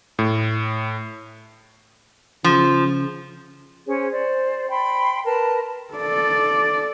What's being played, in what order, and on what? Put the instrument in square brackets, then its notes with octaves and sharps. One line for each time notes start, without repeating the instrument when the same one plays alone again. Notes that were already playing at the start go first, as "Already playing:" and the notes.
[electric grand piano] A2
[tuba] C#3 [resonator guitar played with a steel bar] F3
[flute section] C#4 G#4 C5 C#5
C5 D5
G5 B5 C6
A#4 B4 A5
[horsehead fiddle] A4 D5